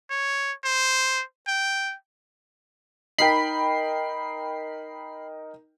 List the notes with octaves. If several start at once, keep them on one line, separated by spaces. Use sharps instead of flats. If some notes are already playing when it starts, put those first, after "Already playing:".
C#5
C5
G5
D#4 A#4 G5 B5 C7